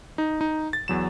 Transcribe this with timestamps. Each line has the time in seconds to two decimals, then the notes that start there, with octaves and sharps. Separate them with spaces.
0.18 D#4
0.41 D#4
0.73 A6
0.88 E2 F#3 E7